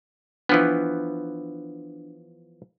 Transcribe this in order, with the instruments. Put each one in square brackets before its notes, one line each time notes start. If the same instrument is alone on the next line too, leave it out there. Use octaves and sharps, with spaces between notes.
[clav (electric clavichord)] E3 F3 B3 [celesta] D4